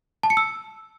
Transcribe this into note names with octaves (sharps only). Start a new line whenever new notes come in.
A5
C#7
E6